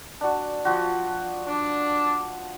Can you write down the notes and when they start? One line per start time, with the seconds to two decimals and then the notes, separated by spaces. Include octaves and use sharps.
0.21 D4 F#4
0.65 F3 F#4
1.46 D4